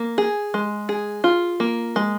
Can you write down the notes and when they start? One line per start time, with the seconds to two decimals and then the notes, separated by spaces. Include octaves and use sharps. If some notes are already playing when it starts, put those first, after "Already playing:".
Already playing: A#3
0.18 G#4
0.54 G#3
0.89 G#4
1.24 F4
1.60 A#3
1.96 G#3